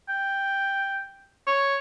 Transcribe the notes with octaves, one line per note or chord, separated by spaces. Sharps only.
G5
C#5